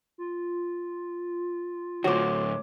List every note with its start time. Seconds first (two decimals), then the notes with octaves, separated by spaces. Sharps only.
0.18 F4
2.04 D2 A2 F#4 C5 C#5 D6